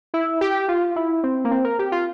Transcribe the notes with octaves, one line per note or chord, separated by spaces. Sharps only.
E4
G4
F4
E4
C4
A#3
C4
A#4
G4
F4